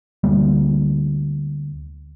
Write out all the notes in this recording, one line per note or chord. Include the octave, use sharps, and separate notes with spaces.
D2 G3 A#3